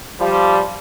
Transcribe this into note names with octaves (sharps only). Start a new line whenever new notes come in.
F3 G3